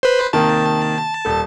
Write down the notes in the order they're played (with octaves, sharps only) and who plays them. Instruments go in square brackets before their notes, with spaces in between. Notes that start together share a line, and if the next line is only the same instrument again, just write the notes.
[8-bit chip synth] B4 C5
[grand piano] C3 D#3 A#3 [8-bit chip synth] A5
[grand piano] D#1 A4